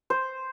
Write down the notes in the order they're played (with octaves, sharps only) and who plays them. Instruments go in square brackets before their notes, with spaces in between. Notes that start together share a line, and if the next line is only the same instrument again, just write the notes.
[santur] C5